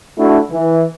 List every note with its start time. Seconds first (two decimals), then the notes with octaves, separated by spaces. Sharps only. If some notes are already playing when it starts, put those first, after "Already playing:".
0.18 A3 D4 E4 F#4
0.51 E3